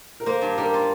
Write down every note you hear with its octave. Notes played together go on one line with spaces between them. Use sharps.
A#4
A#3 C5
G2
G3 A#4
F4